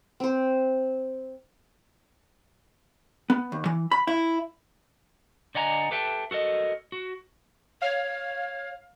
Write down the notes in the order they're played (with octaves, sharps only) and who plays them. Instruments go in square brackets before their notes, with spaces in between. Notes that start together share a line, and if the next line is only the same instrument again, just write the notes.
[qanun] C4 C5
[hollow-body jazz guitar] B3
D#2
E3
B5
E4
[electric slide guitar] D3 D5 D#5 F#5 G#5 A#5
G4 A4 B4 E5 G5 A5
F#4 A4 A#4 D#5
F#4
[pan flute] C#5 [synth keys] F5